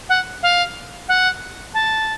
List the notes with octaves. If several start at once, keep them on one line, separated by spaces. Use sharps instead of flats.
F#5
F5
F#5
A5